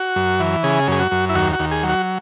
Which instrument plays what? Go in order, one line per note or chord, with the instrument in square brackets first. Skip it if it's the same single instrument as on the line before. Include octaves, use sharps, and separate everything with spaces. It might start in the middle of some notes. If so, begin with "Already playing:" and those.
Already playing: [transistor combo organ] F#4
F#2
E3
C#3 G#4
F#2 G#4
F#4
F#2
E4
D#2 F#4
F#4
D#2
G#4
F#3
F#4